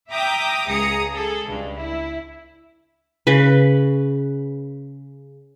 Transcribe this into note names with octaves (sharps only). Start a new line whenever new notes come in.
E5 G5 A#5 D6 D#6 G6
C#2 G#4 A#5 D#6 C#7
G#4 A4
C#2 G2 G#3
E4
C#3 B4